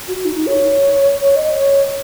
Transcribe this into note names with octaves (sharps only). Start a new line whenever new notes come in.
F#4
D#4
D#4
C#5
C#5
D#5
C#5